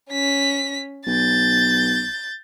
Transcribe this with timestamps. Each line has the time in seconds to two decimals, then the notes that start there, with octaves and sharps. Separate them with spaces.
0.10 C#4 B6
1.07 B1 G6 A6